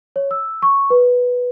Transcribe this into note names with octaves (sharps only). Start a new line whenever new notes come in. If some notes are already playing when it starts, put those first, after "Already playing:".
C#5
E6
C#6
B4